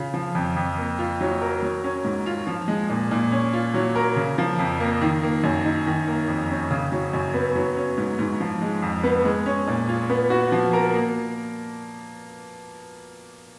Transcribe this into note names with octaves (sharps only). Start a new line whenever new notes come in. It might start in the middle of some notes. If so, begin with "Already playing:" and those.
Already playing: C#3 F4
F3
F2
F2
A#3
F4
F#3
A#4
F#3
C#4
G#2
F4
F3
G#3
A#2
A#2
C#4
F4
F#3
A#4
C#3
F3
F2
A#3
D#3
A#3
F#2
D#4
D#3
A#3
F2
C#4
C#3
F#3
F#2
B3
F#3
C#4
G#2
G#2
F3
G#3
F2
B3
G#3
C#4
A#2
F4
B3
F#4
F3
A#4
A#3